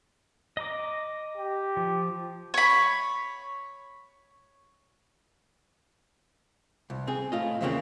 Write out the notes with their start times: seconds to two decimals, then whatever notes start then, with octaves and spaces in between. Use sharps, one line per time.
0.57 D#5 A#5 D6
1.37 G4
1.77 F3
2.54 C#5 B5
6.90 C2
7.07 C4 G#4
7.32 A2 F4 D#5
7.61 E2 A#2 C#3 G#3 A#3 C4